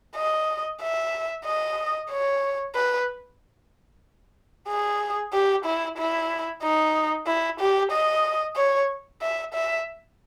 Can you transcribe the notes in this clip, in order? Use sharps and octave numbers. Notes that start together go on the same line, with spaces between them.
D#5
E5
D#5
C#5
B4
G#4
G4
E4
E4
D#4
E4
G4
D#5
C#5
E5
E5